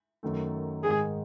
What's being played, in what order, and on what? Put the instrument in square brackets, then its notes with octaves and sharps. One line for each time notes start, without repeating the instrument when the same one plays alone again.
[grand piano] F#2 D#3 A3
[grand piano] G#2 D#3 G#3 [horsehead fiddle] G#4